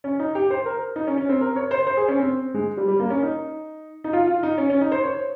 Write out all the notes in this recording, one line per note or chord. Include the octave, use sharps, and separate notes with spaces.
C#4
D#4
G4
C5
A#4
D#4
C#4
C#4
C4
A#4
C#5
C5
C5
G#4
C#4
C4
G#3
G3
G3
A#3
C#4
D#4
D#4
F4
F4
D#4
C#4
C#4
D#4
C5
C#5